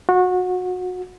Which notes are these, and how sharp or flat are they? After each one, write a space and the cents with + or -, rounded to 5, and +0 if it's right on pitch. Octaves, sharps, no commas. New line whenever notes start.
F#4 -25